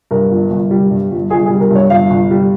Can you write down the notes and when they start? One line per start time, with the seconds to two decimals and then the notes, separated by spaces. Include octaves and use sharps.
0.11 G2 A#4
0.31 G1
0.51 G1
0.71 G3
0.90 G2
1.11 G1
1.30 G1 G#4
1.46 G3 G#4
1.60 A#4
1.71 G2 C#5
1.90 G1 F5
2.10 G1
2.31 G3